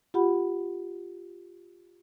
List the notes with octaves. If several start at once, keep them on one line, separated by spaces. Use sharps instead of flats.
F4 G4 F#5 B5